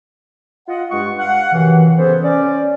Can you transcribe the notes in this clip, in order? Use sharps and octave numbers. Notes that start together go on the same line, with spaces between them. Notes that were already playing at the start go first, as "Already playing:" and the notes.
F4 D#5 F#5
G2 G#3 F#5 C#6
F5 F#5
F#2 C3 D#3 E3
C#3 B3 G#4 A4 B4 C5
C#4 D5